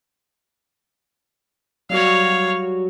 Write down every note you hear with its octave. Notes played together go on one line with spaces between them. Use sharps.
F#3 G3 F#4 C#5 F5